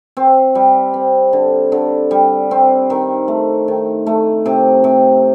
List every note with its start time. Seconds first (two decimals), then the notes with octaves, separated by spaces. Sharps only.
0.17 C4
0.55 G3
0.94 C4
1.33 D3
1.72 D3
2.11 G3
2.51 C4
2.90 D#3
3.28 A3
3.68 D#3
4.06 A3
4.46 C3
4.84 C3